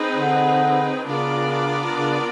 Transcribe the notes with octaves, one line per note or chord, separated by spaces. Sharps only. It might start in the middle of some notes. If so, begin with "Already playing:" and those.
Already playing: C4 D#4 G#4 B4
D3
C#3 B3 D4 F4 A#4 D5
C#3